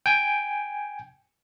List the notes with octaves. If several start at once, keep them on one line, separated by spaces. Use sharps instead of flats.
G5 G#5